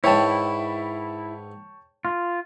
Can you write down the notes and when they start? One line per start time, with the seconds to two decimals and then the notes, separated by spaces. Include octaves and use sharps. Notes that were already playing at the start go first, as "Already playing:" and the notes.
0.04 G#2 D#3 E3 E4 C#5 G5 A5
2.05 F4